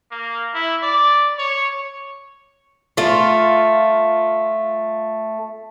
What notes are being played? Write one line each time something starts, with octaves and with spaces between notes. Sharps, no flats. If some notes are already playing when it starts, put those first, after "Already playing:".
A#3
E4
D5
C#5
A3 F4